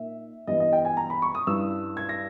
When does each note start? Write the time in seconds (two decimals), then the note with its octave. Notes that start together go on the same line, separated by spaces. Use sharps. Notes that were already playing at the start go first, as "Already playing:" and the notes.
Already playing: A#2 A#3 D#4 E5
0.47 G2 E3 G3 B3 D#5
0.60 D#5
0.73 G5
0.85 G#5
0.97 A#5
1.10 B5
1.22 C#6
1.35 D#6
1.47 G2 G3 C#4 E4 E6
1.97 G#6
2.09 A#6